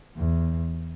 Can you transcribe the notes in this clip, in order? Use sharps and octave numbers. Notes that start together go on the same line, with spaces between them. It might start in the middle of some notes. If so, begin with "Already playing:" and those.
E2